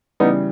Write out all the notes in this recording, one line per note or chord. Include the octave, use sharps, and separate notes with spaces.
C#3 E3 G3 B3 D#4